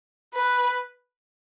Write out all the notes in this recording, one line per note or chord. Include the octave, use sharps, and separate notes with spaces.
B4